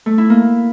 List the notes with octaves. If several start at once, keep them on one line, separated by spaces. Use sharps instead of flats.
A3
E4
A#3